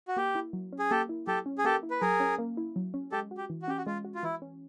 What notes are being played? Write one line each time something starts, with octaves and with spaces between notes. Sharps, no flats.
F#4
A#3 G4
E4
F#3
C#4
G#4
A#3 G4 A4
E4
F#3 G4 A4
C#4
G#4
A#3 G4 A4
E4
B4
F#3 G#4 A#4
C#4
A#3
E4
F#3
C#4
G#3 G4 A4
F#4
G4
E3
F#4
C#4 G4
F#4
G#3 F4
F#4
F4
E3 E4
C#4